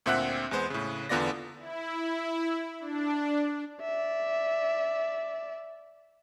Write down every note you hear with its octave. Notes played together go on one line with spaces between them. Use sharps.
D2 A#2 C4 E5 F#5 F#6
E2 G#3 B3 C5
A2 C#3
E2 D3 B3 F4 D5 A#6
E4
D4
D5 E5